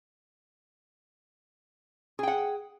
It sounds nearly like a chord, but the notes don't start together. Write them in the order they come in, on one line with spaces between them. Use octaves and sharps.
G#4 G5 F#5